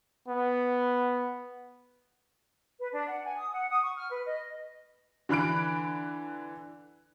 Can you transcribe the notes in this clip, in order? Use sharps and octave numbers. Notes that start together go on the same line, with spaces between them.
B3
B4
D4
F#5
G#5
D#6
F#5
D#6
C#6
F6
B4
D#5
D3 E3 B5 F#6 D7